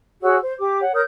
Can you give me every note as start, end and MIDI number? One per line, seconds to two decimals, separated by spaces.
0.22 0.36 66
0.22 0.36 68
0.22 0.36 73
0.22 0.36 88
0.41 0.52 72
0.58 0.80 67
0.58 0.80 86
0.80 0.92 73
0.80 0.92 78
0.93 1.01 70
0.93 1.01 73
0.93 1.01 87
0.93 1.01 91